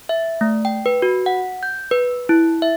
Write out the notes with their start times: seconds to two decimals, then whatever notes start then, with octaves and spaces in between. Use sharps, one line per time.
0.09 E5
0.41 A3
0.65 G5
0.86 B4
1.02 F#4
1.26 F#5
1.63 G6
1.91 B4
2.29 E4
2.62 E5